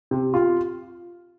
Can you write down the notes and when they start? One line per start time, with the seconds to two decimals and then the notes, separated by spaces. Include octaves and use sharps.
0.11 C3
0.34 F4